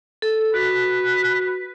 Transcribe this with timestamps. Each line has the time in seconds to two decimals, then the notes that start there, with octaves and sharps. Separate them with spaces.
0.22 A4
0.54 F#4 B4